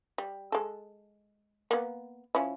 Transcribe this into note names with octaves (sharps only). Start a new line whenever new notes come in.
G3
G#3 A4
A#3 B3
F3 C#4 E4